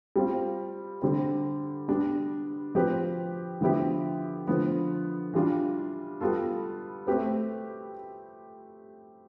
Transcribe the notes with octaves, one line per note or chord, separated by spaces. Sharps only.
G3 C4 F4
D3 G3 C4
G3 B3 D4
F3 C4 G4 B4
D3 F3 B3 E4 G4
D3 F3 B3
E3 G3 D4 F4
G3 B3 F4 A4
A3 C4 G4 B4